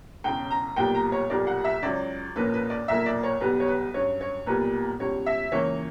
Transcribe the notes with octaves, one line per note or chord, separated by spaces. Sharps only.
E1 E2 C#3 G5
A#5
B1 A#2 G3 B3 G5
A#5
C#5
B1 A#2 G3 A#3 D5
F#5
E5
C#2 C#3 F#3 D5
A#1 A#2 A#3 C#4 B4
B4
D5
B1 A#2 A#3 E5
D5
C#5
B1 B2 G3 B3 B4
C#5
B4
G2 F#3 C#4 C#5
C#5
B1 A#2 G3 B3 B4
C#2 B2 G3 C#4 C#5
E5
C#2 C#3 E3 A#3 C#5